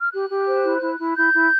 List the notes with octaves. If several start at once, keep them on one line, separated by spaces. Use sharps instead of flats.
F6
G4 F#6
G4
C5
E4
E4
E4
E4 G6
E4